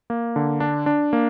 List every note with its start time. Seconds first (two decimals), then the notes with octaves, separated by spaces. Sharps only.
0.10 A#3
0.36 D3
0.60 D4
0.86 D4
1.13 A#3